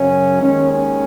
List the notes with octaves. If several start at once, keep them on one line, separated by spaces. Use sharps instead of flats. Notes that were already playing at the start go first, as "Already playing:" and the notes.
Already playing: F#2 C#3 F#3 C#4
D#2 D#3 G#3 C#4
C#4